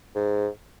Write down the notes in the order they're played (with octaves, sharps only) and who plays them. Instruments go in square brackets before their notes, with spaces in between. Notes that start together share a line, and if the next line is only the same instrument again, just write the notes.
[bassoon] G#2